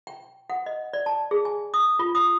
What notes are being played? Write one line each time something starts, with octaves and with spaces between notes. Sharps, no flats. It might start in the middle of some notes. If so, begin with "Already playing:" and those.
G5
F#5
D#5
D5
A5
G#4
G#5
D#6
F4
D#6